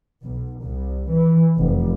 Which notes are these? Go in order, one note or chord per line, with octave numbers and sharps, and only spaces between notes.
B1
C2
E3
F1